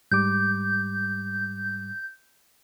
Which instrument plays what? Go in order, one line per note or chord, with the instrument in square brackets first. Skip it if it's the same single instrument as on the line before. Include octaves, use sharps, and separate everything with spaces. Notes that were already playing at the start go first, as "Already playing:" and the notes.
[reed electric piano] G#2 G3 D6 [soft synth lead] G6